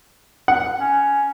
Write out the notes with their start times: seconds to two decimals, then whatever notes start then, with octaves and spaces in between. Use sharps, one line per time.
0.48 F#5
0.80 C#4